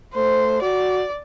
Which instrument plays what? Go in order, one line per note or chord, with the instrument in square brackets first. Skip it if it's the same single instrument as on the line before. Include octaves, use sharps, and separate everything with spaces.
[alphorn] A3 [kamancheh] C5
[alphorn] F#4 [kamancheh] D5